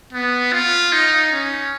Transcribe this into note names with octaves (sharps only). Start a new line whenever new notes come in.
B3
F4
D#4
C#4